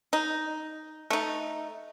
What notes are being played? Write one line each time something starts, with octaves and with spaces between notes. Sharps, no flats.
D#4
A3 D#4